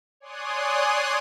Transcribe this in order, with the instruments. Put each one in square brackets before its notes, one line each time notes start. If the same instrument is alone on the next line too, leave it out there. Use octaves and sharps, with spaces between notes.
[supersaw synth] C#5 D5 G#5 C6 D#6 F#6